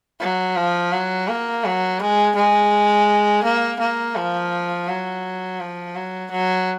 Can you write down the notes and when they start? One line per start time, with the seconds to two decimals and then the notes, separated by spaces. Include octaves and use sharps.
0.20 F#3
0.56 F3
0.92 F#3
1.28 A#3
1.65 F#3
2.00 G#3
2.36 G#3
3.44 A#3
3.80 A#3
4.16 F3
4.88 F#3
5.60 F3
5.95 F#3
6.31 F#3